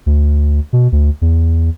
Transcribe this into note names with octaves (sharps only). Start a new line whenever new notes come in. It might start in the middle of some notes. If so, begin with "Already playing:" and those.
D2
B2
D2
E2